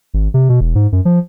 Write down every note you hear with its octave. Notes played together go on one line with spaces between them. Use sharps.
G#1
C3
B2
E1
G#2
F#2
F3